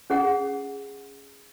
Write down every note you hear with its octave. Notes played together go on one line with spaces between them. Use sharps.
C#4 G#4 F#5